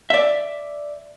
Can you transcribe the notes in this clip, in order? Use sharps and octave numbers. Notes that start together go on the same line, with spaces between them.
D5 E5